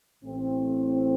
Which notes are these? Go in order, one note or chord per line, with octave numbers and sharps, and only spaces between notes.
A1 A2 A3 C4